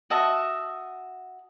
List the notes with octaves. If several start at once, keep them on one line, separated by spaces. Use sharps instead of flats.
F#4 D#5 E5 A5